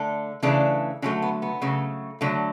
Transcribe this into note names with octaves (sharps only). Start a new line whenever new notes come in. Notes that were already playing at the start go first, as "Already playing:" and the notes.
Already playing: D3 A3
C#3 E3 A3 D4
D3 F#3 A3 C#4
B3
B3
C#3 F#3 A3
D3 F#3 A3